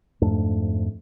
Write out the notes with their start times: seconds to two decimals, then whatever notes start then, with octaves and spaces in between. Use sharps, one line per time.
0.22 F2 G#2 A3 D4